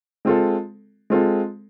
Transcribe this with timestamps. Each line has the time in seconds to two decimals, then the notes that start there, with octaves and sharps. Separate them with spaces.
0.25 G#3 C4 F4 A4
1.10 G#3 C4 F4 A4